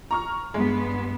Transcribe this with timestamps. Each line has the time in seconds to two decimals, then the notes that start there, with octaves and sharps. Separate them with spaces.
0.11 A#5 C#6 F6
0.54 G2 G#3 B3